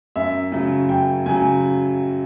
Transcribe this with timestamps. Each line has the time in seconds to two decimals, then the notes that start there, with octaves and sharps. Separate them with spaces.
0.16 F#2 E5
0.52 C#3 F#3
0.89 F#2 G5
1.26 C#3 F#3 G#5